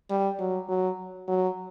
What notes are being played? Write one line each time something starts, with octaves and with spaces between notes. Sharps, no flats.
G3
F#3
F#3
F#3